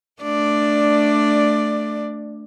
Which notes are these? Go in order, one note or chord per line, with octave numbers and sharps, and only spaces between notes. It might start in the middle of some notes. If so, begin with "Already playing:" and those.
A3 D4 D5